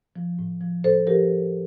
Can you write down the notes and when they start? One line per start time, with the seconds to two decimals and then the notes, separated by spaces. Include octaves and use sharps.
0.16 F3
0.39 A2
0.61 F3
0.84 A2 A4 C5
1.07 F3 G4 A#4